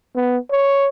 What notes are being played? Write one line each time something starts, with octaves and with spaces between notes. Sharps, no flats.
B3
C#5